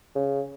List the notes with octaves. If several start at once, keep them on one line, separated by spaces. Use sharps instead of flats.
C#3